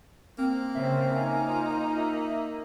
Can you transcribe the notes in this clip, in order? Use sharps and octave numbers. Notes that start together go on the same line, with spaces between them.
A#3 C4
C#3 C4 E5
D#4 G#5
F4
E5